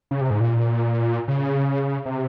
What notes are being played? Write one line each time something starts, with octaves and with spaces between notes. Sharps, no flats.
C#3
C3
G#2
A#2
C#3
C3